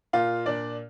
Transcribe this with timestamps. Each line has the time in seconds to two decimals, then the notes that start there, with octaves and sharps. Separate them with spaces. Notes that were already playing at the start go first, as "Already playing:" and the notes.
0.13 A#2 F4 F5
0.46 A#2 D4 D5